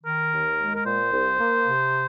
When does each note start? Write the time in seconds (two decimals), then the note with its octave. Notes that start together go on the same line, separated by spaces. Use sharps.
0.03 D#3 A#4
0.31 D#2
0.58 G#3
0.73 A#4
0.84 A#2 C5
1.12 C2
1.39 A#3
1.66 C3